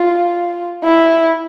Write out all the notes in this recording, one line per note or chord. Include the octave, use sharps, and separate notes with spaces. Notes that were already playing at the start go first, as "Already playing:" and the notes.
Already playing: F4
E4